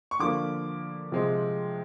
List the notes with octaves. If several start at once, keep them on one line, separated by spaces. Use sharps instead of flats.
C#6
D3 F3 A#3 D6
C3 F3 G#3 C4